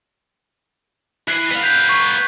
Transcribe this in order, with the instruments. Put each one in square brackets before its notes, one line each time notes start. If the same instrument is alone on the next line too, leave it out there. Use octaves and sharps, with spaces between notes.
[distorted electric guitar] E3 [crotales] F#6 C7 D#7
[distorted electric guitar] B3 F5
[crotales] G6 B6
C#6 G#6 D#7